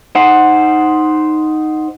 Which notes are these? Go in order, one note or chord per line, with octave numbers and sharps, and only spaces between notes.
D#4 C5 F#5